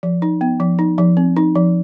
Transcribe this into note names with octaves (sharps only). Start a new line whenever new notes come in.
F3
D#4
B3
F3
D#4
F3
C4
D#4
F3